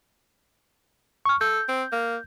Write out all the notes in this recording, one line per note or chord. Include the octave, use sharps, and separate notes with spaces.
C#6 F6
A4 G6
C4
A#3